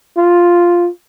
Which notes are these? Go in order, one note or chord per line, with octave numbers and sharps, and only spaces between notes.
F4